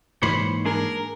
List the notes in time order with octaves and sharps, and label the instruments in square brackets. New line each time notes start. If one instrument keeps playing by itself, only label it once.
[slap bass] G#2 E3 A#3 [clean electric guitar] C5 C#5 B5
[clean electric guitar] D4 G#4 [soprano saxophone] A#4